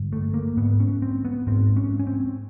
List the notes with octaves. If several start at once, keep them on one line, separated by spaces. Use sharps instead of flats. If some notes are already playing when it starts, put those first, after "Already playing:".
Already playing: G2 D3
A3
A#3
G#2 B3
C#4
C4
B3
G#2 C4
C#4
C#4
C4